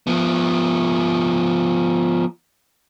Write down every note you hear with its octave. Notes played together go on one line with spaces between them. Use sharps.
F3 B3